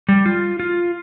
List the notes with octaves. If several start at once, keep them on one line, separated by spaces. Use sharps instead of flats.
G3
F4
F4